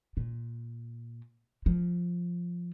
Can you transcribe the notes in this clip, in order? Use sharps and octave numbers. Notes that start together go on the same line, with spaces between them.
A#2
F3